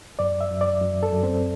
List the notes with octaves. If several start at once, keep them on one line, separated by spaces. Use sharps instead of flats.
F#2 D5
E5
F#2
D5
F#2
A4
F#2
C4